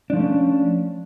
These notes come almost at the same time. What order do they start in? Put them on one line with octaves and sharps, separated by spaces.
D4 F3 A3 C#4